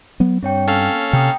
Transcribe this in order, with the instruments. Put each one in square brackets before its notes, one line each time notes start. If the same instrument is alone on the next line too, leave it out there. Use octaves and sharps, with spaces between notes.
[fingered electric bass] F#3 B3
[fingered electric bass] G2 [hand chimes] C4 C#5 G5
[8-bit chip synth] C#4 A4 F5
[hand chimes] A#3
[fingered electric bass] C3 [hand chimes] G5 A#5 D#6